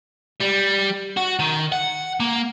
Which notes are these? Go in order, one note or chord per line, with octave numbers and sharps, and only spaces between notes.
G3
F#4
D#3
F#5
A#3